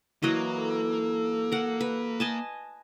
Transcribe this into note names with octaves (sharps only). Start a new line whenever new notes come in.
E3 F#3 A#3 D#5
A4
A#4 F#5
B4
D#5 G#5 A5